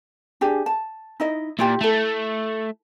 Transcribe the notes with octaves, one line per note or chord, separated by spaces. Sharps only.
D4 G4 G#4
A5
D#4 E4 D#5
A#2 E4 F4 G4
A3 E4 A4